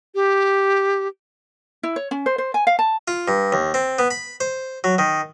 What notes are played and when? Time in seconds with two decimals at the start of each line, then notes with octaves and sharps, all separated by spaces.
0.15 G4
1.83 E4
1.96 C#5
2.11 C#4
2.26 C5
2.38 C5
2.54 G#5
2.67 F5
2.79 A5
3.08 F4
3.28 G2
3.53 D#2
3.74 C4
3.99 B3
4.10 B5
4.40 C5
4.84 F#3
4.98 D#3